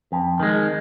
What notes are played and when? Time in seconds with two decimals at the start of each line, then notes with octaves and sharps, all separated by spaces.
0.12 F2
0.40 D#3 G#3